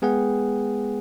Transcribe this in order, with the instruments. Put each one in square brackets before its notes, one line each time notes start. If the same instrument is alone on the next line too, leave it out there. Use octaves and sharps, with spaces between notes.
[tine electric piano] G#3 B3 G#4 B4 F#5 G5